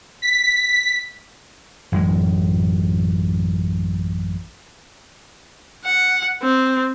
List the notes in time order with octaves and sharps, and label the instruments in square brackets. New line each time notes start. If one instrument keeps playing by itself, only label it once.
[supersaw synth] B6
[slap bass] A1 F#2 A2 G#3
[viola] F#5
C4